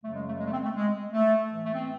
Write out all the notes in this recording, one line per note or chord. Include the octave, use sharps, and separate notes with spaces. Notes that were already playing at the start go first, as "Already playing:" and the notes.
F#2 C#3 F#3 A3
G#3
A3
G#3
A3
C4
A3
G#3
A3
A2 E3
A3
C4